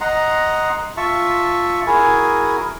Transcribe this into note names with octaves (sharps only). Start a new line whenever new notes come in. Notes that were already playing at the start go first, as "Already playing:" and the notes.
D#5 F#5 A#5 C6
F4 E5 A5 C#6
E4 F#4 G#4 A#4 G#5